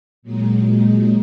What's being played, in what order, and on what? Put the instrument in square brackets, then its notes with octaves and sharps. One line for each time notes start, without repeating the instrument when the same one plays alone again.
[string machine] A#2 F#3 G#3 D#4